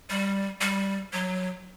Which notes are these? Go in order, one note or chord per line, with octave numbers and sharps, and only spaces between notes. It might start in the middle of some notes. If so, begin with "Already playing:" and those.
G3
G3
F#3